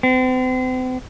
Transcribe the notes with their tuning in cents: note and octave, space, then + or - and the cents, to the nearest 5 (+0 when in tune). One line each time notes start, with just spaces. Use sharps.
C4 -40